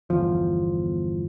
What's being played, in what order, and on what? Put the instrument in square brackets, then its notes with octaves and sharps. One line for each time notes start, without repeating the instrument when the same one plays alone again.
[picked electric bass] G1 E2 F3